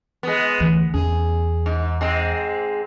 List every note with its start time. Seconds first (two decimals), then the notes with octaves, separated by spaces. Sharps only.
0.23 G#3 B3
0.60 D2 E3
0.94 E2 C#4 G#4
1.66 G#2
2.01 G#2 G#3 C4